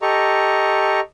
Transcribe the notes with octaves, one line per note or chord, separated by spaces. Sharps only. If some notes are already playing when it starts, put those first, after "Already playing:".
G4 A4 D#5 A#5 C#6